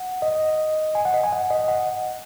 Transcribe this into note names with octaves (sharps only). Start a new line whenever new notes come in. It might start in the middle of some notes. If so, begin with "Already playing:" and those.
Already playing: F#5
D#5
G#5
F#5
D#5
G#5
F#5
D#5
F#5